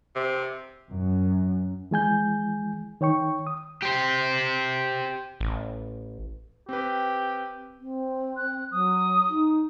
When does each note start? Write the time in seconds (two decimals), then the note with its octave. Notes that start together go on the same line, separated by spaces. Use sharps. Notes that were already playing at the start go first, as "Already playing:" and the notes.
0.16 C3
0.92 F#2
1.91 E3 G#3 G#5 G6
3.01 D#3 C#5 G5 C#6
3.47 D#6
3.82 G4 C5
5.40 A1
6.69 C4 G4 B4
7.80 C4
8.37 F#6
8.72 F#3 D#6
9.30 D#4